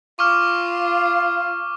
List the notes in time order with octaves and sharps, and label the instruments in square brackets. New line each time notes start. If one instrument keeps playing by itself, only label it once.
[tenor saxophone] F4 [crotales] C#6 D6 F6